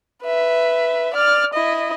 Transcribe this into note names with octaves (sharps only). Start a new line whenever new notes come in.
B4 E5
D5 F6
E4 D#5